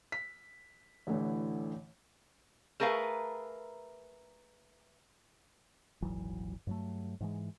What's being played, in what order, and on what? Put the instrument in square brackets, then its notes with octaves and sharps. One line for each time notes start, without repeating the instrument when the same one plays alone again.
[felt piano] B6
A1 A2 D3 E3
[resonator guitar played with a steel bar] A3 G#4 A#4 B4 F5
[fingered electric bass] D#1 G#1 E3 F#3
G2 F#3 A3
G#2 E3 G#3